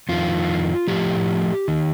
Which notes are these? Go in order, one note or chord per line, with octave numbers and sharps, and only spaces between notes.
F2 D#3 F4
A2 F3 G4
D#3